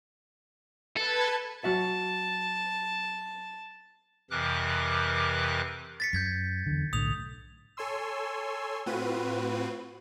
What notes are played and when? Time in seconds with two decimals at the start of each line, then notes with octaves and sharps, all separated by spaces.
0.97 A4 B4 A5 G#6
1.64 F#3 F#4 E5 A5
4.31 F2 C3 E3 A#4 D6 F#6
6.00 A6 B6 C#7
6.13 F#2 G6 G#6 B6
6.66 E2 D3
6.93 B1 A2 D3 D#6 F7
7.77 A4 C#5 G#5 C6 E6
8.86 A2 C4 F4 F#4 B4 D#7